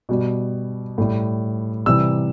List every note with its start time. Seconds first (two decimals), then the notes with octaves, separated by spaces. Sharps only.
0.09 B2 G3
0.98 A2 G3
1.86 C3 E3 G3 E6